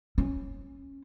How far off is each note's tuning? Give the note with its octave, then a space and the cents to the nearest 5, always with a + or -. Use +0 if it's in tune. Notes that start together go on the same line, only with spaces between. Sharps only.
C#4 -15